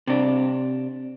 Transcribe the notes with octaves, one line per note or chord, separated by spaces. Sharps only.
C3 D4